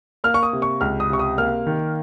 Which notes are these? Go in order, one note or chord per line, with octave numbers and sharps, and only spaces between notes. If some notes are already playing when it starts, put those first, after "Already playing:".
A#3 F6
C#6
D#6
C3
C#6
C#2 F6
D#6
C3 C#6
D#6
A#3 F6
D#3